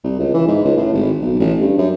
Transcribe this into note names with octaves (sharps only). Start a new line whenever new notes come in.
C2
C#2
E3
G#2
C#2
A2
G#1
B1
A1
G2
F#2